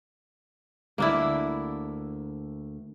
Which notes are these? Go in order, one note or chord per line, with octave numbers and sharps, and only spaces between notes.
D2 D3 A#3 D4 E4